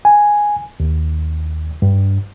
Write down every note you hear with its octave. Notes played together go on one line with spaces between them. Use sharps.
G#5
D#2
G2